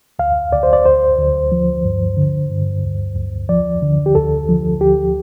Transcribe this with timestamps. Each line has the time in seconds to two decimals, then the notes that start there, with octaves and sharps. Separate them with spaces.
0.19 D2 F5
0.53 D2 D5
0.63 C5
0.73 D5
0.85 D2 C5
1.18 D2
1.52 F3
1.84 G2
2.17 D3
2.50 G2
2.83 D2
3.16 D2
3.49 F3 D5
3.82 D3
4.06 G4
4.15 D2 A4
4.49 F3
4.81 D2 G4